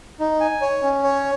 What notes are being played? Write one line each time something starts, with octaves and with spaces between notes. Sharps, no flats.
D#4
G#5
C#5
C#4
C#5